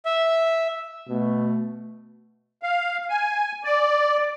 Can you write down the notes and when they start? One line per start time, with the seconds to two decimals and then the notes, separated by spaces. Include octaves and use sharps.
0.05 E5
1.08 B2 A3
2.63 F5
3.10 G#5
3.64 D5